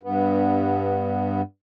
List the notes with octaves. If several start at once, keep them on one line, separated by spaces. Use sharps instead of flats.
G2 B3